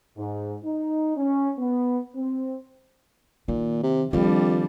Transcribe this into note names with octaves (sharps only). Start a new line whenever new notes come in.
G#2
D#4
C#4
B3
C4
A#2 D#3
C3
F2 D#3 F3 G3 D4